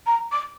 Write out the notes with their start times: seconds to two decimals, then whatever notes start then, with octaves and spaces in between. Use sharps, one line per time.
0.06 A#5
0.32 D6